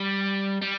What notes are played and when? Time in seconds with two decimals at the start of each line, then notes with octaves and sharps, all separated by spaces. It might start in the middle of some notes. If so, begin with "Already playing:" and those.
Already playing: G3
0.61 G3